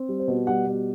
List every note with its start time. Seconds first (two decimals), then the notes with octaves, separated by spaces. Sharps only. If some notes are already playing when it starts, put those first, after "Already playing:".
Already playing: C4
0.09 G3
0.19 C5
0.28 B2
0.47 G3 F#5
0.67 B2